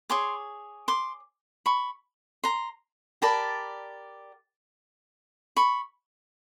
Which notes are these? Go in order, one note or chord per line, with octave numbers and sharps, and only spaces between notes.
G#4 C#5 C6 D6
C6 D6
B5 C#6
A#5 C6
G4 A#4 D5 A5 B5
B5 C#6